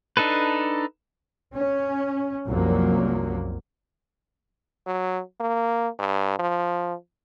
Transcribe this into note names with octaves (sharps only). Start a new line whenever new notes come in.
D4 D#4 A4 B4
C#4
C2 F#2 F3 F#3 A#3
F#3
A#3
G2
F3